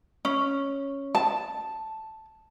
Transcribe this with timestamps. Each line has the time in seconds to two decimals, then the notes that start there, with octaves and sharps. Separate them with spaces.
0.25 C#4
1.15 A5